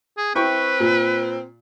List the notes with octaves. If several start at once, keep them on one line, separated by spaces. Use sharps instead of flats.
G#4
C4 E4 B4 G5 C#6
A#2